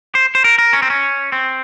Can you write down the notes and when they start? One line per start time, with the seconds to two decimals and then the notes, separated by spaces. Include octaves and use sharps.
0.15 C5
0.35 C5
0.44 A#4
0.58 A#4
0.73 C#4
0.82 C4
0.90 C#4
1.32 C4